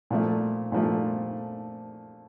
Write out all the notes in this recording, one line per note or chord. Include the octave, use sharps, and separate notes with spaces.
A#2 F3 A3
A#2 F3 A3